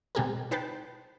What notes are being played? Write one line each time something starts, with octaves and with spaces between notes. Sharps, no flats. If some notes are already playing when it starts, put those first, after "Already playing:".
B2 G#3 C4 G4 G#4 A#4
D#4 B4 C5 G5 A5 B5